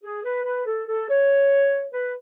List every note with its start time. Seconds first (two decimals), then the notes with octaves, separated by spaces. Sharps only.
0.03 G#4
0.24 B4
0.45 B4
0.66 A4
0.87 A4
1.09 C#5
1.93 B4